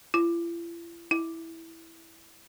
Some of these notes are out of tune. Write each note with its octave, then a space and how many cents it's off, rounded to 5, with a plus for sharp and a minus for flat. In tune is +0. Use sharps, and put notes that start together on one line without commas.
E4 +45
E4 -5